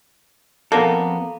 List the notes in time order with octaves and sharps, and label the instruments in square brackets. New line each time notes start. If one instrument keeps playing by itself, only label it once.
[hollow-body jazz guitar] F2 B3 A4 [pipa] A#3